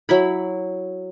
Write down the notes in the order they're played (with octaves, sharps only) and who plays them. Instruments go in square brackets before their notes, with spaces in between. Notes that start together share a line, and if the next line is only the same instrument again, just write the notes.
[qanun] F#3 E4 B5